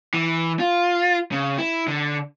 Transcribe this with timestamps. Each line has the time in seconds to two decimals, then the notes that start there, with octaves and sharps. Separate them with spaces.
0.14 E3
0.60 F4
1.32 C#3
1.58 E4
1.87 D3